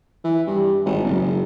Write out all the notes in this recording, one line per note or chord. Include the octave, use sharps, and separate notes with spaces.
E3
G2
G#1
F#1